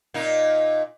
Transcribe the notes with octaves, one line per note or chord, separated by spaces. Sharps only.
A#2 D#4